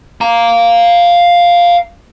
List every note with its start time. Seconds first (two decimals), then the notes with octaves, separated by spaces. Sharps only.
0.21 F5 A#5